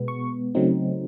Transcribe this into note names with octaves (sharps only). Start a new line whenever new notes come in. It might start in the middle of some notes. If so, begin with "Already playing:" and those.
Already playing: B2 G#3 B3
C#6
C#3 F#3 A3 C4 D#4